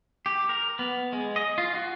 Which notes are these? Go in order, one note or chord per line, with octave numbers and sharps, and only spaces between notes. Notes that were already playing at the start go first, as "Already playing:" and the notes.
G4
A#4
B3
G#3
D#5
F4
F#4